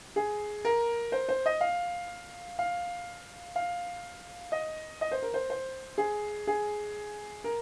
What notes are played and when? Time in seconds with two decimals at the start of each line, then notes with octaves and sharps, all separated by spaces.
0.16 G#4
0.65 A#4
1.12 C5
1.29 C5
1.46 D#5
1.61 F5
2.59 F5
3.56 F5
4.52 D#5
5.01 D#5
5.12 C5
5.22 A#4
5.34 C5
5.50 C5
5.98 G#4
6.47 G#4
7.44 A#4